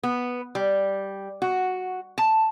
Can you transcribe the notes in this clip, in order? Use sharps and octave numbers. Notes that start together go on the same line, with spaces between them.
B3
G3
F#4
A5